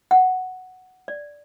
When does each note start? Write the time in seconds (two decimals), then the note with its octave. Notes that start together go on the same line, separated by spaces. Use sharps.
0.11 F#5
1.08 D5